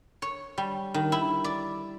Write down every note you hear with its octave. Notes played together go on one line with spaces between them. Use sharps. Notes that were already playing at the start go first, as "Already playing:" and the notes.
C#5
G3
D#3
E4
D5